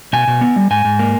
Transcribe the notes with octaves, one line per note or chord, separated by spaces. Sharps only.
B2 G#5
B2
B3
G3
G#2 G#5
G#2
A#3